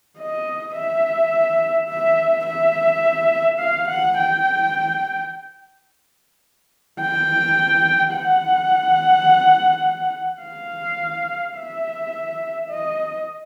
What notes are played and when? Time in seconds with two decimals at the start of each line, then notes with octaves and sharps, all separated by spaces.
0.19 D#5
0.75 E5
1.89 E5
2.46 E5
3.59 F5
3.88 F#5
4.17 G5
7.01 G5
8.14 F#5
10.42 F5
11.56 E5
12.70 D#5